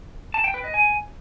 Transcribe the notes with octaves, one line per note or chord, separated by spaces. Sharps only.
A5
G5
B4
D#5
G#5